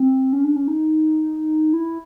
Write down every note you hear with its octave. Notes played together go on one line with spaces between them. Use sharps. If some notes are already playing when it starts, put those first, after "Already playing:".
Already playing: C4
C#4
D4
C#4
D#4
E4